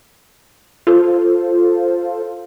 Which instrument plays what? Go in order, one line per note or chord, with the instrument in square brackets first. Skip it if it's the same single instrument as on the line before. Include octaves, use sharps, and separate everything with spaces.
[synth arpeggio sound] F4 A4 C5